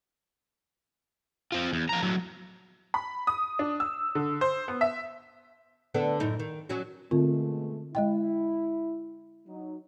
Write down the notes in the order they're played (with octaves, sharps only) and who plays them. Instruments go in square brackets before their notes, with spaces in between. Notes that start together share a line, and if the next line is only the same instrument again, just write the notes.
[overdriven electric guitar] C4 F4
E2
F3 A#5
A2 F#3
[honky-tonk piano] B5
D#6
D4
E6
D3
C5
B3
E5
[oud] D3 B3 A4
F#2 A2 D#4
D#3
F#3 C#4 F#4
[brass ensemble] B2 G#3 A3 [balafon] D3 C4 F4
[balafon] G#3 D#5 G5 [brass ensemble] E4
[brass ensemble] F#3 D#4